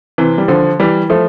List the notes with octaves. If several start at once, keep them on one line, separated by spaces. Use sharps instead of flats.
C3 E3
G3
D3 F3
E3 G3
F3 A3